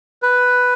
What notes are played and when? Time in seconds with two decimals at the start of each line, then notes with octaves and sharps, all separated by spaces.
0.23 B4